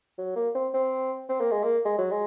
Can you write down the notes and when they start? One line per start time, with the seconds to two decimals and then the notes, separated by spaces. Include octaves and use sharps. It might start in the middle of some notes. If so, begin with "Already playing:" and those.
0.18 F#3
0.36 A#3
0.55 C4
0.74 C4
1.29 C4
1.40 A#3
1.51 G#3
1.63 A#3
1.85 G#3
1.98 F#3
2.11 G#3